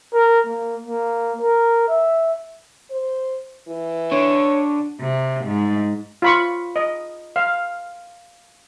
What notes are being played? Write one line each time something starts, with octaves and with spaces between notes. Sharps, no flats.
A#4
A#3
A#3
A#4
E5
C5
E3
D3 C#5
C3
G#2
F4 B5 C#6
D#5
F5